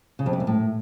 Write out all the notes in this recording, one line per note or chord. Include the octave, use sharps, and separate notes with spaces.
C#3
F2
C3
F#2
A2